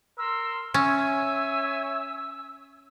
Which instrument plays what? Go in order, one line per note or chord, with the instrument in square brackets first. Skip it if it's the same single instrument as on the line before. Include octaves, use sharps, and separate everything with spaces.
[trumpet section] A#4 C6 [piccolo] E6
[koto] C#4 [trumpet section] C#5 E5 G#5 [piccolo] E6